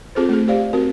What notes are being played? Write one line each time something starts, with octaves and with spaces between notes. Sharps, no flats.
C4 F4 G#4 A4 C5
A3 G#4
G4 C5 D5 F5
C4 F#4 A#4